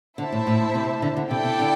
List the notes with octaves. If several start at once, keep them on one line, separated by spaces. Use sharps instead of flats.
D3 E4 C5 E5 A5
A2
A2
C3
D3
D3
C3 E4 A4 D5 G5
C3
D3